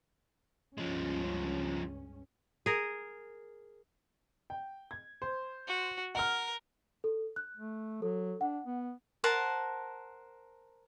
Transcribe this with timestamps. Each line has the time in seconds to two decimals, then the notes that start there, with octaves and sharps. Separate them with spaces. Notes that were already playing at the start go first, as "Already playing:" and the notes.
0.78 C#2 G2 F3 G#3 C#4
2.66 G#4 A#4
4.50 G5
4.91 G#6
5.22 C5
5.68 F#4
6.15 A#4 F#5 F6
7.04 A4
7.36 F#6
7.57 A3
8.02 F#3 A4
8.41 D4 F#5
8.66 B3
9.24 A#4 C5 F#5 A5